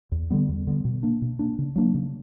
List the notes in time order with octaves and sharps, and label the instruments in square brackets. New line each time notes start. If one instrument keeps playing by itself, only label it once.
[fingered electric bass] E2
D3 G3 B3
E2
D3 G3 B3
B2
A#3 D4
B2
A#3 D4
C#3
F#3 A#3 D4
C#3